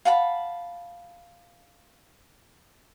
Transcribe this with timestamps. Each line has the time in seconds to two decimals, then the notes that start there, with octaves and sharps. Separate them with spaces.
0.05 F5 F#5 A5 B5